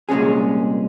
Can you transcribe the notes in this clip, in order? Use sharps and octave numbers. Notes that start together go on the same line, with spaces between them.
C2 A#2 G#3 C#4 G#4